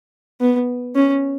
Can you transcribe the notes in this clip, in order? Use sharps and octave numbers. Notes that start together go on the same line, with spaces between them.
B3
C#4